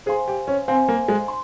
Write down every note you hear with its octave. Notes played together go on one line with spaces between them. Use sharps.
G#4 C5 F5 G#5 C6
G4
C#4
C4 C5 F5 G#5 C6
A#3
G#3
C6